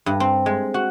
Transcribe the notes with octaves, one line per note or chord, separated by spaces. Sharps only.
G2
C4
G#3
F#4